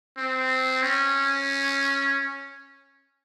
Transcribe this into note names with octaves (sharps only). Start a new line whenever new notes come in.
C4
C#4